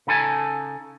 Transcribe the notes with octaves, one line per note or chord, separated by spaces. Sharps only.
C#3 D#4 A4 G#5